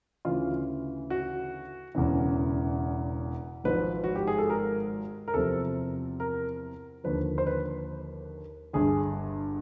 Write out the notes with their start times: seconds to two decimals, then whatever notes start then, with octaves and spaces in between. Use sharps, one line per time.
0.25 D2 C#3 E3 F4
1.10 F#4
1.95 E1 E2 C#3 E3
3.64 G#1 G#2 F3 B4
4.04 F#4
4.15 G4
4.27 G#4
4.38 A4
4.50 A#4
5.28 A#4
5.34 E2 C3 F3 A4
6.20 A#4
7.04 D#2 D3 F3 B4
7.38 C5
7.47 B4
8.73 G1 G2 D3 G#4